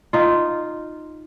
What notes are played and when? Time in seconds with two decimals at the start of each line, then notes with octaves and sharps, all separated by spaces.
0.13 D#4 F4